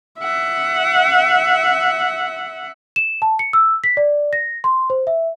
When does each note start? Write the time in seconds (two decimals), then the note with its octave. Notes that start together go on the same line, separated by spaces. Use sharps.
0.19 E5 F#5
2.96 E7
3.22 A5
3.39 C#7
3.53 E6
3.84 B6
3.97 D5
4.33 A#6
4.64 C6
4.90 C5
5.07 E5